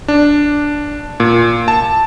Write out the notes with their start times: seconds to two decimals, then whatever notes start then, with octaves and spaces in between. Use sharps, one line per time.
0.08 D4
1.20 A#2
1.68 A5